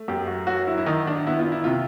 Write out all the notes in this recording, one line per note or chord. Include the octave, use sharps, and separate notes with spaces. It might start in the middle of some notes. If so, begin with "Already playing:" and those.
Already playing: A3
F#2 G4
F#4
F#3 F#4
E4
E4
D#3 D#4
D4
B3 E4
F4
E4
C3 F4